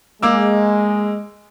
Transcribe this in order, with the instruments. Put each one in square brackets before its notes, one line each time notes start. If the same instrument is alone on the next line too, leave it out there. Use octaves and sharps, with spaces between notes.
[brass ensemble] G#3 [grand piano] A#3 D6 E6